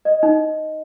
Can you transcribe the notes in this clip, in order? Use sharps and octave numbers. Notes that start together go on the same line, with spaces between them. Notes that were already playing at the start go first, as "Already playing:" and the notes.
D#5
D#4